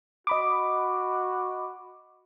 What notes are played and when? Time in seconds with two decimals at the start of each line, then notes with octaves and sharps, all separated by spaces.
0.27 F#4 D#5 B5 D6